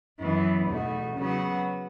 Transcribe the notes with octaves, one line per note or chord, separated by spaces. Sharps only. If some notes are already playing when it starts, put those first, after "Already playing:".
F#2 E3 B3
E2 B2 A3 D#4 F#4
C#3 F#3 B3 F#4